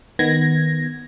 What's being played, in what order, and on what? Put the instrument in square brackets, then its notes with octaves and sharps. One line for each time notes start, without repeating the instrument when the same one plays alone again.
[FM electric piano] D#3 B3 G#6 A#6